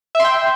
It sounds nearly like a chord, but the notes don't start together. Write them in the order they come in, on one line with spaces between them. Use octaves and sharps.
E5 C6 G5